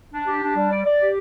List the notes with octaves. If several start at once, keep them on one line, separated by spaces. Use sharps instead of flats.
D4
G4
D4
G3
D5
D5
G4